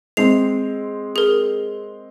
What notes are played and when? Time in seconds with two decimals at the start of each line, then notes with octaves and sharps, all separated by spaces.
0.17 G#3 C4 C7 F7
1.16 G#4 A#4